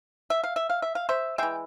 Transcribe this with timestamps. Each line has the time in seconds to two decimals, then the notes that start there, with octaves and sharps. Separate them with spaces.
0.30 E5
0.44 F5
0.56 E5
0.70 F5
0.82 E5
0.95 F5
1.09 C5 E5
1.38 E3 G#3 E5 G5